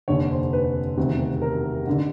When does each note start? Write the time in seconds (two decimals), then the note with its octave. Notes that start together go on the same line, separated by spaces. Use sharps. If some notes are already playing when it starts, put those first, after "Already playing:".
0.08 F1 D#2 D3 C#5
0.30 C5
0.53 B4
0.97 E1 D2 C3 D#3
1.42 A#4
1.87 A1 D3